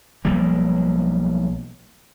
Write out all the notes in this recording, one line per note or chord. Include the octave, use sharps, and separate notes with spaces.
B1 F3 G3 A#3